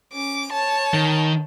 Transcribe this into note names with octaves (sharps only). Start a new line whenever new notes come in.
C#4 D6
C#5 A5
D#3